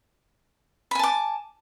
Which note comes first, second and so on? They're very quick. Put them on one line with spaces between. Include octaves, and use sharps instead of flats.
B5 G#5 A5 D6